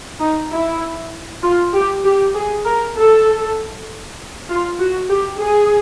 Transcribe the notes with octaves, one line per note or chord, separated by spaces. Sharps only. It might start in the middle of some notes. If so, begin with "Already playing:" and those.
D#4
E4
F4
G4
G4
G#4
A#4
A4
F4
F#4
G4
G#4